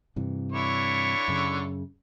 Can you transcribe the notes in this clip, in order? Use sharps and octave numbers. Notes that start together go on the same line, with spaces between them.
G2 C3 E3
D3 E4 C#5
F#2 C#3